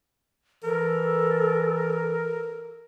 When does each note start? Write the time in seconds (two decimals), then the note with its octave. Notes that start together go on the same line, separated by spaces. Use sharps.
0.64 E3 A4 A#4